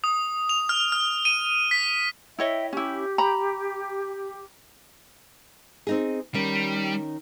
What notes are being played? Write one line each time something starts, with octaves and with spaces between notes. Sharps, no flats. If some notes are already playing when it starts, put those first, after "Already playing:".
D#6
F7
F6
F6
D#7
B6
E4 C#5 D#5 E5 G5
C#4 E4 G4
A#5 B5
C4 D#4 G#4
D#3 G3 C#4